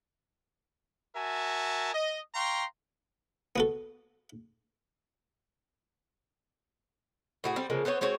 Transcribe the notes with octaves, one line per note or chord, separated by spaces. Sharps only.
F#4 A#4 E5 G#5 A5
D#5
F5 G5 A#5 C6 C#6
B3 F#4 A4
A2 F#4 G#4
G3 C4
C#3 F3 G#3 A#3
B3 C4 C5 C#5
G#3 C4 F#4 C#5